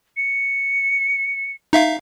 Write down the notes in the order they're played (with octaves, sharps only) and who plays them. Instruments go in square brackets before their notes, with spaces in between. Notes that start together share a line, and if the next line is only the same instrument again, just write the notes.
[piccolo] C#7
[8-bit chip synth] D#4 E5 F5